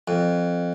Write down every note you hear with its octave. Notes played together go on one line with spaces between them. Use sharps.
F2